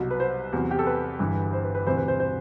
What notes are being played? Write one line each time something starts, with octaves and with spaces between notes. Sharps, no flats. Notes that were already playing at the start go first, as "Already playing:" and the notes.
Already playing: C2 B2 F#3
B4
C5
E2 C3 F#3
G4
A4
B4
G1 G2 E3
C5
B4
B4
E1 D2 C3 E3 C5
B4
C5
C5